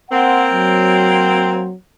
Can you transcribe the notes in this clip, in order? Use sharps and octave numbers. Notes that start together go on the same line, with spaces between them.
A#3 C4 F#5
F#3